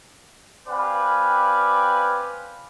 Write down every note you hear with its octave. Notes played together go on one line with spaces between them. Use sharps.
C4 G4 B4 D5 F5 G#5